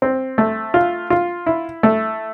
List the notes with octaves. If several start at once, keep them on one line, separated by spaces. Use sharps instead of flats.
C4
A3
F4
F4
E4
A3